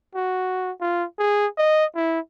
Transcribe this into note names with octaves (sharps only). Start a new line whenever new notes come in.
F#4
F4
G#4
D#5
E4